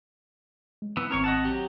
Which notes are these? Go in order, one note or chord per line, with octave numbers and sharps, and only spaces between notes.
G#3
E3 B3 E6
G#1 C4 A#4 C#5 C#6
D#5 F#5 A5
F#3 G4